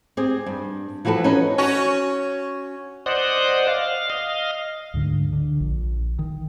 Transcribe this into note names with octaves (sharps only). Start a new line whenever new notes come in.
C4 G4 G#4
G2
E3 F3 F#4 A4 B4
C#4 D#4 A#4 B4
C#4 F#4
C5 D5 D#5 F#5
F5
D#5 F5
D2 G#2 D3
D3
A#1
D#3